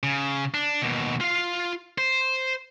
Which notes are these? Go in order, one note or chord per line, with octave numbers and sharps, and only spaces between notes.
C#3
D4
D#2 B2
F4 F5
C5